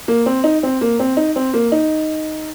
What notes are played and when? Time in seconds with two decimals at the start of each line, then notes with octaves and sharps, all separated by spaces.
0.08 A#3
0.26 C4
0.44 D#4
0.63 C4
0.81 A#3
1.00 C4
1.17 D#4
1.36 C4
1.54 A#3
1.72 D#4